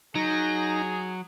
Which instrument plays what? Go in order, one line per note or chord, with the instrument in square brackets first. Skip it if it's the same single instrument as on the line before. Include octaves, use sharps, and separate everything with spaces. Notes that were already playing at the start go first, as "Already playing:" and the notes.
[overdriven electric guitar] F#3 [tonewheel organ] D#4 A#6 [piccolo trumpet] G#4